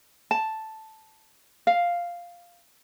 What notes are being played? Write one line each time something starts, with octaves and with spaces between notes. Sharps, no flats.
A5
F5